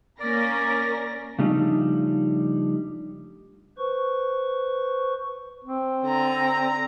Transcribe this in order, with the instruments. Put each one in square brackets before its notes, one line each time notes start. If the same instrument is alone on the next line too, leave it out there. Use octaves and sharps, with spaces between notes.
[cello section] A#3 C#4 [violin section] A#4 A#6 [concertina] D5
[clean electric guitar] C#3 F3 G3 A3 D4 D#4
[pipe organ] B4 C5 C#6
[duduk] C4
[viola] D3 A#5